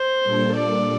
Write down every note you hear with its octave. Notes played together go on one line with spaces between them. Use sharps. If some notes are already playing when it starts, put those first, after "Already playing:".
Already playing: C5
A#2 G3 A#3 D4 A4
D5